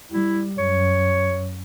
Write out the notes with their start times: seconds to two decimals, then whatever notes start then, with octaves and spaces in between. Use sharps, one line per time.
0.12 G3 E4
0.58 F#2 C#5